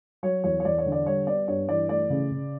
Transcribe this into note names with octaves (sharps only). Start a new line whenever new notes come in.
F#3 C#5
E2 C#5
C#5
E2 D5
C#5
D3
D5
G3 C#5
B3 D5
G2 C#5
E3 D5
A3 D5
C#3
C#3